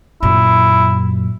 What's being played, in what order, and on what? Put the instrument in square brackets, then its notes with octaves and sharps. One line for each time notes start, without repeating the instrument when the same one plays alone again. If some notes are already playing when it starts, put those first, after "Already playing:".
[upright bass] F#2 A#2 [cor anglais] E4